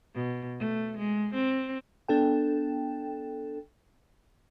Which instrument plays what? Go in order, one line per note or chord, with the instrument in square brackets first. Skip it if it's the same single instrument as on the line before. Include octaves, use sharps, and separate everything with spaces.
[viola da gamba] B2
A3
G#3
C4
[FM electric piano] B3 D4 A4 G5